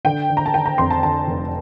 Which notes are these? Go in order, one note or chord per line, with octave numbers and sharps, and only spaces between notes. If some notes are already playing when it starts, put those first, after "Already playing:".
D3 G5
D3
A#5
A5
D3 G5
A#5
F2 C6
A5
D3 A5
F1